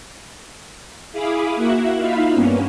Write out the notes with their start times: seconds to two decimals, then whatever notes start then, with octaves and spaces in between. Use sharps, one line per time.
1.12 E4 G#4 F5 B5 D6 D#6
1.56 A#3 E4 F#4 E5 F#5
1.96 D#4 F4 E5 F5 B5
2.31 G2 A#3 B3 C#4